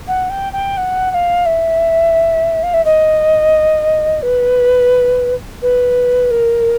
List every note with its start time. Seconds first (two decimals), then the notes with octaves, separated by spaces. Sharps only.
0.07 F#5
0.29 G5
0.52 G5
0.77 F#5
1.10 F#5
1.14 F5
1.45 E5
2.62 F5
2.73 E5
2.85 D#5
4.22 B4
5.62 B4
6.30 A#4